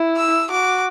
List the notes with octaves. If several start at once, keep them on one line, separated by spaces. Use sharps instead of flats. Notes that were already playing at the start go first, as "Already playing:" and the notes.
Already playing: E4
E6
F#4 D6